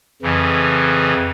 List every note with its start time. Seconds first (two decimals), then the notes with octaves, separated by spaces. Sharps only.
0.22 F2 C#3 E3